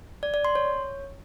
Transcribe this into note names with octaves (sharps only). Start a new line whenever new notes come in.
D5
D5
C6
C#5